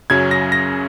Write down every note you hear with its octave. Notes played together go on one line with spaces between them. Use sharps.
F#2 C#3 F#3 C#4 G#6
A#6
A#6